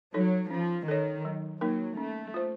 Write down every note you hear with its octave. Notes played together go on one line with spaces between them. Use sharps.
F#3 D#4 A4 C#5
F3 C#4
D#3 A4 C#5
F#3
F#3 A#3 D#4 A#4
A3 C#4
F4 C5